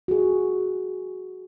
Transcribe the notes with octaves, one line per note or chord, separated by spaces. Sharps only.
F#4 G#4